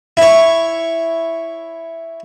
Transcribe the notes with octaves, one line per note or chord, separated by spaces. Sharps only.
E4 C#5